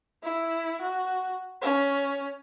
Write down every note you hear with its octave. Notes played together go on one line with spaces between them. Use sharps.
E4
F#4
C#4